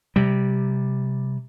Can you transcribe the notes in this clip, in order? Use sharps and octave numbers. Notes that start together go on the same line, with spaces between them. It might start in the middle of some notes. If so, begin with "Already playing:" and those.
C3 G3